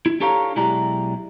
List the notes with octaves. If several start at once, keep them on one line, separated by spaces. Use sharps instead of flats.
E4
D4 G4 A4 C#5 F5 A#5
B1 G#3 E4 G4 D5 A#5